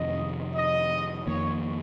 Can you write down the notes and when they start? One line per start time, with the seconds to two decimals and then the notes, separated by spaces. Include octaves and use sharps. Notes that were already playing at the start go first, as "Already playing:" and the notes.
Already playing: F2 C3 D#3 D#5
0.55 D#5
1.27 F2 D#3 A#3 C#5